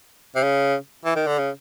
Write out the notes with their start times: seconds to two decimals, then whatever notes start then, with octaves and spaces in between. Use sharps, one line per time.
0.36 C3
0.43 C#3
1.05 E3
1.16 D#3
1.27 D3
1.39 C#3